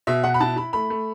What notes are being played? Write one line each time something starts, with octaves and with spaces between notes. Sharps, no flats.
B2 E5
B2 F#5
B5
E4 A5
E4 B5
A3 B5
A3